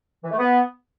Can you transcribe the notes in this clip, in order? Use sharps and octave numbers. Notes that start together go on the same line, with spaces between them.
E3
A3
B3